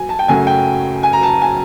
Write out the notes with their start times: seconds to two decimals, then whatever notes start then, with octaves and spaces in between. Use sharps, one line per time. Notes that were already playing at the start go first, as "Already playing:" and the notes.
Already playing: F#3 G#5
0.09 A5
0.19 G5
0.28 F#2 C#3 F#3 A3 G#5
0.47 G5
1.03 G#5
1.13 A#5
1.23 A5
1.42 G#5